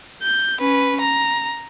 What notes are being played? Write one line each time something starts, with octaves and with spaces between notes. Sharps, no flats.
G6
C#4 B4
A#5